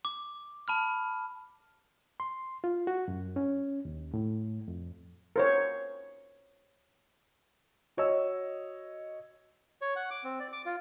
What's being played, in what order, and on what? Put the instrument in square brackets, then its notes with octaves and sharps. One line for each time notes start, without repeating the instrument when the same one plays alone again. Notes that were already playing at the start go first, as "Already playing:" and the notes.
[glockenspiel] D6
A5 B5 F6
[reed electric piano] C6
F4
F#4
F#2
C#4
D#2
A2
F2
[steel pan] A#4 C5 C#5
[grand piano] F#4 C#5 D#5 E6
[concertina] C#5
F#5
D6
C4
D5
D6
F4